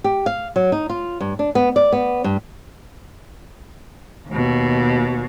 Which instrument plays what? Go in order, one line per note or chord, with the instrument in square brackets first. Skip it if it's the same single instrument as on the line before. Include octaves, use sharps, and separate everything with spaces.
[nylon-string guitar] G4
F5
F#3
D#4
F4
G2
D4
B3
D5
B3
G2
[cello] D#2 B2